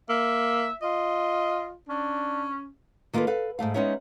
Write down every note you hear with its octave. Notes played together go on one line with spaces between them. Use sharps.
A#3 E5
F4 D#5
C#4 D4
D#3 A#3 F4 G4 A4 B4
A4 B4 F5
G#2 E3 A3 F5
G#3 B3 C#4 D#4 C#5 E5